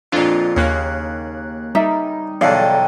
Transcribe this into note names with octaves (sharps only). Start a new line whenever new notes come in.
F2 A#2 D4 F4
D#2 C#3 A#3 F#6
G3 D#4 E5
B1 E2 D3 D5 D#5 F5 G5 A5